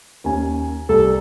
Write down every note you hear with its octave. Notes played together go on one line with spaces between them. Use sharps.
D#2 C#4 G#5
C2 A4